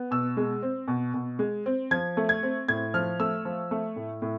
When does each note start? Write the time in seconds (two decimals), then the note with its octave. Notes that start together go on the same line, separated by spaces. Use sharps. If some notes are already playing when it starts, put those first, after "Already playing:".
Already playing: B3
0.11 B2 E6
0.37 G#3
0.63 C4
0.88 B2
1.14 B2
1.39 G#3
1.66 C4
1.91 F3 G#6
2.17 A3
2.29 G#6
2.43 C4
2.68 A2 G#6
2.94 F3 F6
3.20 A3 E6
3.45 F3
3.71 A3
3.96 A2
4.22 A2